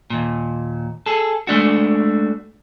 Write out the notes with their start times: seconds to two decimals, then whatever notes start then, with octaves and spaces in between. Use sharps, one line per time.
0.10 D#2 A#2
1.06 G#4 A4
1.47 G#3 A3 D4 F#4